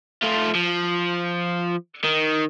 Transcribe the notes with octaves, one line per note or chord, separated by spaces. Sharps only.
A3 F4
F3
D#3